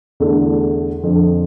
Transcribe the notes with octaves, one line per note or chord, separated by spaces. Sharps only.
E2 D3 A3 D4
F2 D3 F3